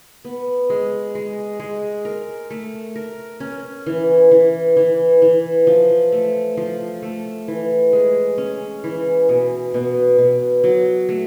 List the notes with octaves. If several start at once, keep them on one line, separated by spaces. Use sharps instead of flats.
B3
G#3
G#3
G#3
A#4
A3
A#4
C#4
E3
E3
E3
E3
F3
A3
F3
A3
E3
G#3
C#4
E3
B2
B2
B2
F#3
A3